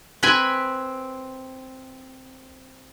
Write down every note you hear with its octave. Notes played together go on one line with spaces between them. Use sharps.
C4 B4 G#5 B5